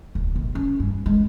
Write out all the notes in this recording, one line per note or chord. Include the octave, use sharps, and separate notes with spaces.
D1
A#1
C#4
G2
G#3